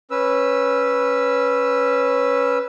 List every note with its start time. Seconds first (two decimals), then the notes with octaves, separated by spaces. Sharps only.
0.11 C#4 B4 E6